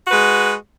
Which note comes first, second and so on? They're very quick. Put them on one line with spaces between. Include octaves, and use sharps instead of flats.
F#4 B4 G#3